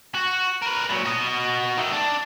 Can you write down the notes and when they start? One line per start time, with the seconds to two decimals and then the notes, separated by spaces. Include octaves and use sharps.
0.15 F#4
0.62 A#4 B4
0.90 A#2 F#3
1.06 F#4 D#5
1.77 D#3 A3
1.93 D4